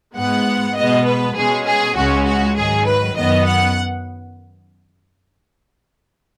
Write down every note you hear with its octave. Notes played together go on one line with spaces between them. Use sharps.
G#2 G#3 B3 F#5
B2 G#3 B3 D#5
B4
B2 G#3 C#4 G#4
G#4
C#2 C#3 G#3 C#4 F#4
F#4
G#2 D#3 F#3 G#4
B4
F#2 D#3 B3 D#5
F#5